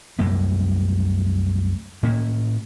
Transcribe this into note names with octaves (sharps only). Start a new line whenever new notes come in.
C2 F#2 A3 A#3
A2 A#3 C#4